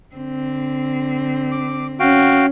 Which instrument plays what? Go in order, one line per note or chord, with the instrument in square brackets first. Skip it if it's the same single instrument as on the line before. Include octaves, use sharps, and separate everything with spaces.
[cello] D3 C4
[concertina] D6
[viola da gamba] C#4 [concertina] F#4 F5 G5